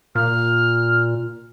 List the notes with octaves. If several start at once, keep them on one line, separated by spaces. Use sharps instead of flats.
A#2 F6